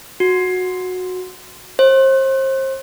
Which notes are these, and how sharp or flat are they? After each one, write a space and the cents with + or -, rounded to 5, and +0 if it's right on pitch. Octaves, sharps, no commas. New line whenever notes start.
F#4 -15
C5 +35